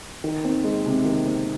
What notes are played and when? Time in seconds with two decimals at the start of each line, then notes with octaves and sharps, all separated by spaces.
0.24 D#3
0.45 C4
0.64 G#3
0.86 C3
1.05 D#3
1.27 C4